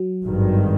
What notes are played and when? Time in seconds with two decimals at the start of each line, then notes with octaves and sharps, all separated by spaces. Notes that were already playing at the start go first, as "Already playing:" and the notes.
Already playing: F#3
0.23 G#1 G2 D#3